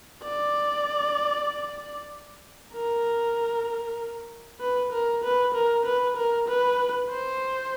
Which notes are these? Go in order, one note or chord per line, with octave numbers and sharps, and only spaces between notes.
D5
A#4
B4
A#4
B4
A#4
B4
A#4
B4
C5